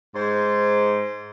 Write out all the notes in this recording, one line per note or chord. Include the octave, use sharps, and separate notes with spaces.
G#2 C5